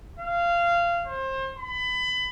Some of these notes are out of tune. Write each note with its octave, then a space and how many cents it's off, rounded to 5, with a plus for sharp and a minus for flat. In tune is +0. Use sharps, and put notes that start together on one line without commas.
F5 -20
C5 +30
B5 +25